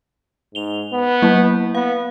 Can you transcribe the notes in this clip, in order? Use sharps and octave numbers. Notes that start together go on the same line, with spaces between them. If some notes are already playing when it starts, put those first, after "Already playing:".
G#2 F7 G7
B3
F#3 A#3 E4
B3 F5